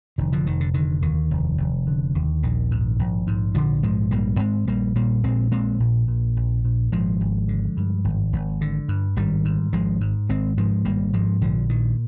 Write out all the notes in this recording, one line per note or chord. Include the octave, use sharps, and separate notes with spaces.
F1 D#3
D3 F3
F1 D#3
D3
D3 D#3
D#2 D#3
F1
F1
D3
D#2
A#1 D#3
G#2
A#1
G#2
A#1 D3 F3
G#2 F3 G#3
A#1 G3 A#3
G#2 G#3 C4
A#1 G3 A#3
A#2 G3 A#3
A#1 G#3 C4
A#2 G#3 C4
A#1
A#2
A#1
A#2
G#1 F3 G#3
G#1
D3
G2
G#1
G#1
D3
G2
G#1 D#3 G3
G#2
G#1 F3 G#3
G#2
G#1 G#3 C4
G#2 F3 G#3
G#1 G3 A#3
G#2 F3 G#3
A#1 D3 F3
A#2 D#3